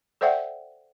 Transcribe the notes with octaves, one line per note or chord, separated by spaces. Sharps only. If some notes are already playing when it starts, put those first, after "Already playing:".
A4 C5 D5 E5 F#5 G5